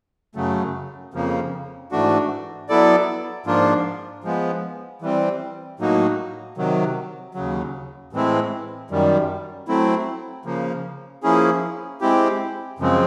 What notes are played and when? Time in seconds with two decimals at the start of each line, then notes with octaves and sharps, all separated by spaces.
0.35 F#2 C#3 F#3 A3
1.14 F2 C#3 F3 A#3
1.91 G#2 E3 A3 D4 F#4
2.69 F#3 B3 E4 A4 D5
3.46 G#2 F3 A#3 D4 F4
4.24 F3 G#3 B3
5.02 E3 G3 C4
5.80 A2 F#3 A#3 D#4 F#4
6.58 C3 D#3 F#3
7.35 D#2 C#3 F#3
8.13 A2 E3 G#3 C4 E4
8.90 F#2 D#3 G3
9.68 F#3 A3 C4 E4
10.45 C#3 F3 A#3
11.23 F3 A#3 C#4 E4 G#4
12.01 G#3 C4 E4 G4
12.79 F#2 C#3 F3 G#3 C4